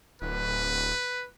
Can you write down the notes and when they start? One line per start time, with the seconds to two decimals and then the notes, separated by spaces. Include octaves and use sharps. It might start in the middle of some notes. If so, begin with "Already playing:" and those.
0.22 D1 B4